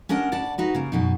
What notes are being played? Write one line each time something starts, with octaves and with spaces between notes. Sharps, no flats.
C#4 D4 A#4 D#5 F#5 A5
D2 D5 F#5 A5
D#4 F#4 B4
C#3 A#3
F#2 B2 D#4